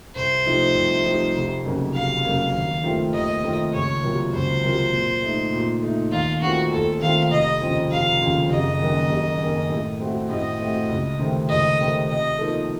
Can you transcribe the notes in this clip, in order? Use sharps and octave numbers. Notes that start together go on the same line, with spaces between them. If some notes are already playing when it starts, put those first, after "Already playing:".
C2 C5
C3 F3 A3 D#4
C2
C3 F3 A3 D#4
F1
F2 C#3 F#3 A#3
F1 F5
F2 C#3 F#3 A#3
D#2
D#3 A3 C4 F4
D#2 D#5
D#3 A3 C4 F4
C#2 C#5
C3 F#3 A#3 F4
C#2 C5
C3 F#3 A#3 F4
A#2
A3 D#4
A#2
A3 D#4
D#2 F4
D#3 A3 C4 F4 F#4
D#2 A4
D#3 A3 C4 F4 F5
F1 D#5
D#2 C#3 F3 C4
F1 F5
D#2 C#3 F3 C4
F#1 D#5
F#2 D#3 A#3
F#1
F#2 D#3 A#3
A2
A3 C4 F#4
A2 D#5
A3 C4 F#4
C#2
C3 D#3 A3 C4
C#2 D#5
C3 D#3 A3 C4
C3 D#5
F3 A#3 D#4 A4